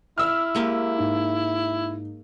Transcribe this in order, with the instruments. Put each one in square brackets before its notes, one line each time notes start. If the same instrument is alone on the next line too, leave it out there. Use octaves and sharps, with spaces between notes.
[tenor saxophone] E4 [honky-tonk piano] E6 F6
[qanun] G#3 A#3 G4
[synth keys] G#2 D#4